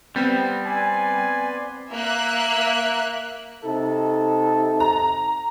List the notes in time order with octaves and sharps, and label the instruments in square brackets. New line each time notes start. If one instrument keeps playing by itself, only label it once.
[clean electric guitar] G3 [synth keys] B3 C4
[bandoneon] B4 D5 C6 [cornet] G#5
[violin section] A#3 E5 F#6
[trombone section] C3 D#4 A4
[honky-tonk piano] A#5